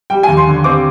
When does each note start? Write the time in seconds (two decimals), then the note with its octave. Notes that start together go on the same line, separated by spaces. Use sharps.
0.10 G3 G5
0.23 D#2 G#5
0.37 C6
0.47 D3
0.64 C4 D6